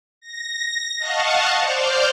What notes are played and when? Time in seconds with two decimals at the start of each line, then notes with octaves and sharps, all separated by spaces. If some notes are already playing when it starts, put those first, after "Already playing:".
0.21 A#6
0.99 D#5 F5 F#5 A5 C#6
1.59 C5 D5 F6 G6